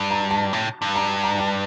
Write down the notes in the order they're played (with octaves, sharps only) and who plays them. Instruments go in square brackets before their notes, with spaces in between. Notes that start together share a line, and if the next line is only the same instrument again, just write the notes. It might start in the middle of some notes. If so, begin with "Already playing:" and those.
Already playing: [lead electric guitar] G2
[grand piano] A#5
A5
[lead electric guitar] A2
G2
[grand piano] A#5
A#5
A5